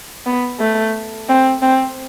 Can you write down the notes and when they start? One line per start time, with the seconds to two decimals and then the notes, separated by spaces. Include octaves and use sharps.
0.26 B3
0.60 A3
1.29 C4
1.62 C4